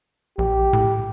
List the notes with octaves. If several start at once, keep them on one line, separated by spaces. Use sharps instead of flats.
A#1 G4
A2